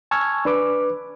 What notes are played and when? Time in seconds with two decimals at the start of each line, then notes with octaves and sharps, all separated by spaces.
0.11 G#5 A5 C#6 E6 F6 G#6
0.45 D4 B4 D6